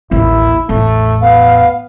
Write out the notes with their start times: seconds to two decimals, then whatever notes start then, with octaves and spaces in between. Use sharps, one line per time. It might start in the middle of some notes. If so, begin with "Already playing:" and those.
0.11 A1 D#2 E4
0.69 A1 E2 A3
1.21 B3 F5